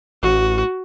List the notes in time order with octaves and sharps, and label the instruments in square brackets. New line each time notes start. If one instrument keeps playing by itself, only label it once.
[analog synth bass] A1 [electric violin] F#4